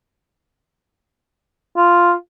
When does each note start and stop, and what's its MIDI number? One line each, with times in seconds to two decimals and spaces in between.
1.76 2.12 65